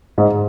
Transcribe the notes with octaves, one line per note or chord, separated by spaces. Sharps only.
G#2